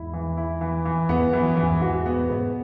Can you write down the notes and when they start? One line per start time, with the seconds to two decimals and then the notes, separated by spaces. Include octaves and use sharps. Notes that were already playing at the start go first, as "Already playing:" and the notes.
Already playing: E2 G#2 E4
0.14 E3
0.37 E4
0.61 E3
0.85 E3
1.09 E2 G#2 B3
1.27 F#2
1.33 E3
1.45 F#2
1.57 E3
1.63 E2 G#2
1.81 E2 G#2 F#4
2.05 G#2 B2 B3
2.29 G#2 B2 B3